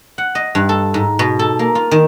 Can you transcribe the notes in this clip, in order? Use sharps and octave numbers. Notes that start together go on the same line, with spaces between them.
F#5
D#5
G2
A4
G#2
B2
A4
A#3
F4
D#3